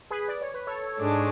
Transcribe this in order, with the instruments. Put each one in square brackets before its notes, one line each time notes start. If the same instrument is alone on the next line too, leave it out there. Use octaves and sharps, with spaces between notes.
[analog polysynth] G#4 B4
D5
C#5
B4
A4 C#5
[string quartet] G#2 G#3 D4